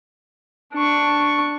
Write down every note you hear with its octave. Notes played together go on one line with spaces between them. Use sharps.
D4 C#6